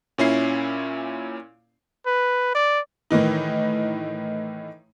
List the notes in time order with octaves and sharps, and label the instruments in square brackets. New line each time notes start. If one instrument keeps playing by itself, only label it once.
[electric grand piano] A#2 C#4 E4 C7
[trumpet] B4
D5
[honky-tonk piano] A2 D#3 E3 D#4